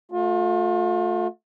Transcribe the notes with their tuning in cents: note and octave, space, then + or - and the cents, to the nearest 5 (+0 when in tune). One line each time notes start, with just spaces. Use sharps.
A3 -5 F4 +40